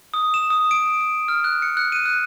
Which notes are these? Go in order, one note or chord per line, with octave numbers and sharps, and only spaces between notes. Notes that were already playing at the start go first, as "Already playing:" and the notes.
D#6
E7
D#6
D7
D7
F6
F#6
C#7
F#6
D#7
F#6